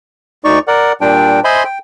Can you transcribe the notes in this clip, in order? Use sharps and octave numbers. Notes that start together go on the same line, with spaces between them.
D2 D#4 D5 C#6
A#4 D5 F#5
A#2 G3 D4 G5
C5 D#5 E5 G#5 B5 C6
G5